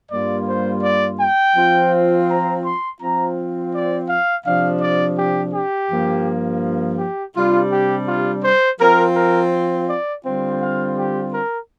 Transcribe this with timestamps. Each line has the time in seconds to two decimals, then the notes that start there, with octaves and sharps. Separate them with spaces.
0.11 G2 G3 A#3 F4 D5
0.47 C5
0.83 D5
1.19 G5
1.56 F3 C4 F4
2.29 A#5
2.64 C6
3.00 F3 C4 F4 A#5
3.73 D5
4.09 F5
4.45 C3 F3 D4 F5
4.81 D5
5.18 G4
5.54 G4
5.90 G2 F3 A#3
6.99 G4
7.35 C3 G3 D4 F4
7.71 G4
8.07 F4
8.43 C5
8.80 F3 C4 F4 A#4
9.16 A#4
9.89 D5
10.24 D3 G3 C4 F4 G5
10.61 F5
10.97 G4
11.34 A#4